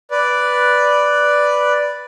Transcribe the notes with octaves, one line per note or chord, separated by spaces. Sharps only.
B4 D5